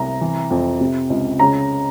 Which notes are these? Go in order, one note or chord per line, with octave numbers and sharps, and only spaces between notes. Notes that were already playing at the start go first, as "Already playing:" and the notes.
Already playing: C2 C3 A#5
E3
F2
C3
C#2
C#3 A#5